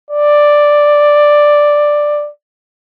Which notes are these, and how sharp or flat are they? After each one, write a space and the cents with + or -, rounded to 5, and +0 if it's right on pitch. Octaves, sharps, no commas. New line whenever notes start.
D5 +5